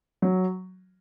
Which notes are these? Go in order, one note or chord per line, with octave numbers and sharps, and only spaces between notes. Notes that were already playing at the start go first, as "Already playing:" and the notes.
F#3